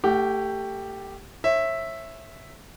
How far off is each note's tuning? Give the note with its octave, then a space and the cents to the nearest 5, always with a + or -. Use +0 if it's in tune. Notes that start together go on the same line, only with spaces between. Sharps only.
A3 +20 G4 +0 F#5 +40
C#5 -35 E5 +0